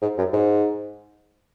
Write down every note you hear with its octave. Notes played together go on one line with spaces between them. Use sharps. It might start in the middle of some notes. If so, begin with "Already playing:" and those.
G#2
F#2
G#2